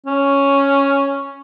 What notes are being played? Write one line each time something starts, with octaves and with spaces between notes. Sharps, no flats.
C#4